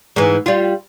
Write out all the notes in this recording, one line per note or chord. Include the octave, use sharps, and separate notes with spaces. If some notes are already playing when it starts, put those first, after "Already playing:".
G#2 E3
G3 F4